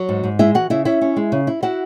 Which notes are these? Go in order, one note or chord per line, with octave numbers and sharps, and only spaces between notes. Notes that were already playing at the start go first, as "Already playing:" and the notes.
Already playing: F#3
G#2
G#2
G#3 E4 E5
E3 F#4 F#5
C#3 E4 E5
C#4 E4 E5
C#4
G#3
C#3
E4
E4 F#4 F#5